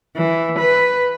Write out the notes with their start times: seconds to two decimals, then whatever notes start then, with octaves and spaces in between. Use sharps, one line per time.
0.16 E3
0.58 B4